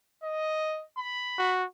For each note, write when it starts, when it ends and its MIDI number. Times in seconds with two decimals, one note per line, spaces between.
0.23 0.82 75
0.97 1.53 83
1.38 1.64 66